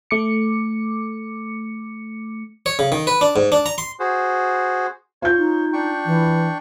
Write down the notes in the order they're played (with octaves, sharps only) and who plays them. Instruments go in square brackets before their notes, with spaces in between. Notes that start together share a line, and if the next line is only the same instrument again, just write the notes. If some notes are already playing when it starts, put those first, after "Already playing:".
[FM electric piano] A3 D6 C#7
[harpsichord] C#5
C#3
D#3
B4
D4
G#2
D4
A#5
C6
[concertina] F#4 G#4 C5
[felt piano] F4 G6 [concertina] C#5
[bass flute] D#4
[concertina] D4 G5 C#6
[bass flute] E3